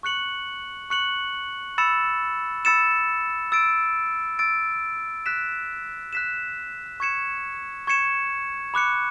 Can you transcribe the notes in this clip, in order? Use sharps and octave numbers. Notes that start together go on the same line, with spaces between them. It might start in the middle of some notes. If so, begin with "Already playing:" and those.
C#6 F#6 C#7 F#7
C#6 F#6 C#7 F#7
B5 E6 A6 C#7 E7
B5 E6 A6 C#7 E7
E6 A6 D7
E6 A6 D7
F#6 B6 E7
F#6 B6 E7
C#6 G#6 C#7 E7
C#6 G#6 C#7 E7
B5 D6 F#6 C#7